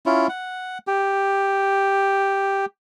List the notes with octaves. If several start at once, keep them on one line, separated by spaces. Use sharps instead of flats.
C#4 E4 F4
F#5
G4